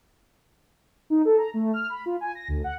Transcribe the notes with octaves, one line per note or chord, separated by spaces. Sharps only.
D#4
A4
A#5
A3
F6
B5
F4
G#5
A#6
D2
F#5